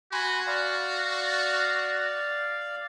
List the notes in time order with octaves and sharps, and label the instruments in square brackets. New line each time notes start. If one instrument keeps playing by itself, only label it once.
[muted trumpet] F#4 [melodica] G#5 B5 C6
[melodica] D5 F5